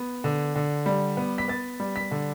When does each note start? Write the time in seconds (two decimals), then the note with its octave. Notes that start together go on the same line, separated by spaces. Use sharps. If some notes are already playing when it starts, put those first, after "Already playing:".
Already playing: B3
0.24 D3
0.56 D3
0.86 G3
1.17 B3
1.38 B6
1.48 B3 A6
1.80 G3
1.96 B6
2.11 D3